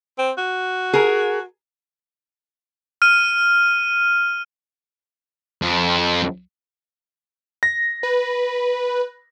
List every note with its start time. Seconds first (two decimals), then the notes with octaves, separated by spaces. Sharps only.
0.18 C4
0.38 F#4
0.93 G#4 A#4
3.02 F6 D#7
5.62 F2
7.63 A#6
8.03 B4